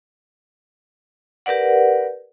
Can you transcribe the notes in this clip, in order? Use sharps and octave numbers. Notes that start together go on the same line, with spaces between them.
G4 A#4 B4 D5 F#5